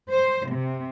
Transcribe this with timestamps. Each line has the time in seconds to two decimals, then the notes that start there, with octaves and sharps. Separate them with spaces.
0.12 C5
0.49 C3